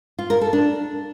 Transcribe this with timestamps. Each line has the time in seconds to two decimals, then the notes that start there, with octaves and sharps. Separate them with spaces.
0.19 F4
0.30 A#4
0.41 A4
0.53 D4